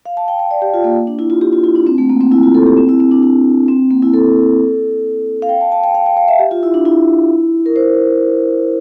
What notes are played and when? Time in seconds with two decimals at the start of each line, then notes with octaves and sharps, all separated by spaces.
0.06 F5
0.17 A5
0.28 G5
0.39 G5
0.51 D5
0.62 G4
0.74 F4
0.84 A#3
1.07 D4
1.19 E4
1.30 F4
1.41 G4
1.53 F4
1.64 E4
1.75 D4
1.87 C4
1.98 A3
2.09 A#3
2.21 C4
2.32 E4
2.43 F4
2.55 A4
2.66 G4
2.77 C4
2.89 E4
3.00 C4
3.11 D4
3.23 D4
3.68 C4
3.91 A#3
4.02 E4
4.13 A4
5.42 F5
5.49 G5
5.61 A5
5.72 A5
5.84 G5
5.95 F5
6.06 G5
6.17 F5
6.28 E5
6.39 G4
6.51 F4
6.63 E4
6.74 D4
6.85 E4
7.66 A#4
7.76 C5